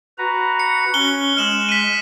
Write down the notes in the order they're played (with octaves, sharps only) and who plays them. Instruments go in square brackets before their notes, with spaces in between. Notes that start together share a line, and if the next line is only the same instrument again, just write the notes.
[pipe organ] F#4 B4 A#5
[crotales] C#7
[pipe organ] C#4 [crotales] F#6 G7
[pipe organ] G#3 [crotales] F6 E7 F#7
[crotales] B6 D#7